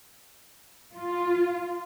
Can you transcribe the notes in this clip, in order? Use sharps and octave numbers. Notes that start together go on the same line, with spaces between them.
F4